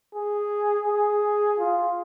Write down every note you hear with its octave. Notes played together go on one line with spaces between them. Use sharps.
G#4
G#4
F4